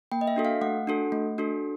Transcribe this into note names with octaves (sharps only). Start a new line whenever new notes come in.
A#3 G5
D#5
E5
D4 F#4 A4
F5
A3 F#5
D4 F#4 A4
A3
D4 F#4 A4